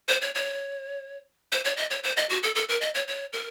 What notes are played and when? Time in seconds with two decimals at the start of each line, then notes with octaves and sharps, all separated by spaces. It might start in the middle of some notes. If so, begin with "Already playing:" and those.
0.08 C5
0.22 C#5
0.35 C#5
1.52 C5
1.65 C#5
1.77 D#5
1.91 C#5
2.04 C5
2.17 D#5
2.30 F#4
2.43 A4
2.55 A4
2.69 A#4
2.81 D#5
2.95 C#5
3.08 C#5
3.33 A#4